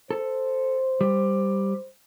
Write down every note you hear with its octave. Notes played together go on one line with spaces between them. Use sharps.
A4 C5
G3